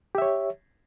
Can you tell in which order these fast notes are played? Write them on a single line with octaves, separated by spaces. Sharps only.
G4 E5 C#5